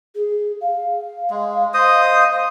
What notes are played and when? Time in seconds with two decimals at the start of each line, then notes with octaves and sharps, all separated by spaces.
0.15 G#4
0.62 F5
1.30 G#3
1.74 C5 D#5 D#6